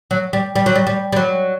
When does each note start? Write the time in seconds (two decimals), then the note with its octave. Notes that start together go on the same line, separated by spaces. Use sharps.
0.11 F#3
0.33 G3
0.55 G3
0.66 F#3
0.75 G3
0.87 G3
1.12 G3
1.16 F#3